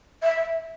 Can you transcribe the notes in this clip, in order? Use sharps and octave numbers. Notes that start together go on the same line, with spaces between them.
E5